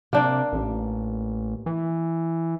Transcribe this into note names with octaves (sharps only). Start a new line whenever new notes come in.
C3 A#3 D4 G5
A1
E3